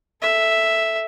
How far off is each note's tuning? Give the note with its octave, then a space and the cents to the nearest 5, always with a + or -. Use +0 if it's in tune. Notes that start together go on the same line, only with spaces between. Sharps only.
A4 +0 E5 +0